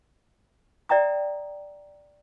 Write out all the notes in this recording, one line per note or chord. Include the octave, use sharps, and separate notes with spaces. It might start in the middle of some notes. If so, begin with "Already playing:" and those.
D5 E5 G5 A#5 D#6